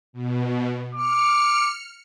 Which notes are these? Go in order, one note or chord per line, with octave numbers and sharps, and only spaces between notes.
B2
D6 F6 C#7